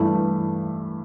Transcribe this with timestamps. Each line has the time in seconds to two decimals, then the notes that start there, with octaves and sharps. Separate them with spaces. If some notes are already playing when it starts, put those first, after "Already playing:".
Already playing: G2 E3 A3 E4